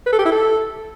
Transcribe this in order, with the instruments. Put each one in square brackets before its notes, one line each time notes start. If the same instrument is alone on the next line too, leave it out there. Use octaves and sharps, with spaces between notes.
[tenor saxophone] B4
A4
G4
E4
A4